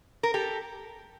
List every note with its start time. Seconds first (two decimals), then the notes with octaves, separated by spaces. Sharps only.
0.23 A#4
0.34 G4 A4